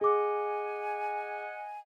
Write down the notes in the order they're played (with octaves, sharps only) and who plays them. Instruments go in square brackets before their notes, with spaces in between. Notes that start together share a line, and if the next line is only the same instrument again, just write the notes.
[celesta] G#4 D6 [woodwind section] D#5 F#5 G#5